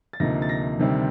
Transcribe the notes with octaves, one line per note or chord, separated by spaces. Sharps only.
A6
D2 C3 F3 A#3 D#4 A#6
A6
A#6
D2 C3 D#3 G3 C4